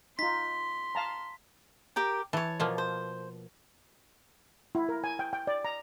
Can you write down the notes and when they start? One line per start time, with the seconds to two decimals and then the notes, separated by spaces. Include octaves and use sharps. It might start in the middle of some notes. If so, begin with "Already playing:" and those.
0.19 D#4 F4 C6 B6
0.95 F5 A5 A#5
1.96 G4 A#4 G5
2.33 E3 C#5 A5
2.60 B2 F3 A#3
2.78 C5
4.75 E4
4.89 A#4
5.04 G#5
5.19 G5
5.33 G5
5.47 D5
5.65 A#5